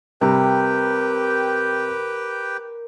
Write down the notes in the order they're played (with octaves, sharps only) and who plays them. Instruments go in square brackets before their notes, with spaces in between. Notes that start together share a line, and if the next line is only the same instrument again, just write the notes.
[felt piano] C3 G3 [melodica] G4 B4 G5 [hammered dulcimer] A#4